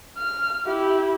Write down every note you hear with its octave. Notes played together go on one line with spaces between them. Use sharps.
F6
E4 G4